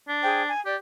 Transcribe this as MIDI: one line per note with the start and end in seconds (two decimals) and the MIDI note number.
0.09 0.50 62
0.23 0.42 68
0.23 0.42 72
0.23 0.42 79
0.49 0.61 80
0.65 0.76 67
0.65 0.74 74